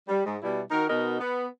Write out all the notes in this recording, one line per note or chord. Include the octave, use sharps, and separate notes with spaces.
G3
G#2 G#3
B2 G3 E4
D#3 D#4 F#4 A#4
B2 B3 D#4 F#4 A#4 D#5
B3